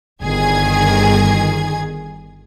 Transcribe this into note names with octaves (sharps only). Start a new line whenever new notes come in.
G1 D#3 G#4 G#6